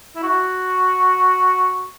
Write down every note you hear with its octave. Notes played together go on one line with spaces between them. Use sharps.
E4
F#4